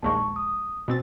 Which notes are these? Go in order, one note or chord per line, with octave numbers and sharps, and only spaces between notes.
A#1 D#2 G#3 A5 C#6
D#6
B2 C4 A6